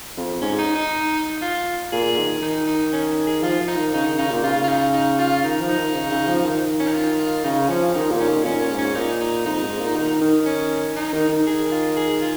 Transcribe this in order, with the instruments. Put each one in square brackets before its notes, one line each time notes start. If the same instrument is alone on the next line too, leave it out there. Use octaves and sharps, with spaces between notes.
[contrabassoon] F2
[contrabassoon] G#2 [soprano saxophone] C#4
[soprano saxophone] D#4
D#4
F4
[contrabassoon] A#2 [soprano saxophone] G#4
[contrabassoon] D#3
[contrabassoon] D#3 [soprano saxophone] D#4
[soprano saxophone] D#4
C#4
G#4
[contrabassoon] F3 [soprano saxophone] F4
[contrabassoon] F3
[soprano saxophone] D#4
[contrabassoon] D#3
[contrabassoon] C#3 [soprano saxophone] D#4
[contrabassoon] D#3
[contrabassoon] C#3 [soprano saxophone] D#4
[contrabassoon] A#2
[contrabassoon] C#3 [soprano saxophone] F4
[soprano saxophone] F4
D#4
D#4
F4
[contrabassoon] D#3 [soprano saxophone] D#4
[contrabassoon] F3
[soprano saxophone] D#4
[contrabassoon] D#3
C#3
C#3
F3
D#3
[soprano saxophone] C#4
D#4
F4
F4
[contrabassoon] C#3 [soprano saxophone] D#4
[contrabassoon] F3 [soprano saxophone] C#4
[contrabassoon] D#3 [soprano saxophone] D#4
[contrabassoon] A#2
[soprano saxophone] C#4
[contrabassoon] D#3
[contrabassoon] A#2 [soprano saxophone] C#4
[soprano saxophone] C#4
[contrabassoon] G#2
[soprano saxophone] C#4
[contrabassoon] A#2 [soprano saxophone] D#4
[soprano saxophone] D#4
[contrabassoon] F2 [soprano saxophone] D#4
[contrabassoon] G#2
A#2
D#3
D#3
[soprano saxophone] C#4
D#4
[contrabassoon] D#3
D#3
[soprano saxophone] G#4
F4
G#4
F4